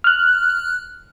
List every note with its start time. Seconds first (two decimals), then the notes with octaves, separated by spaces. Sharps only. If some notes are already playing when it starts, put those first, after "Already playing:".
0.04 F6 F#6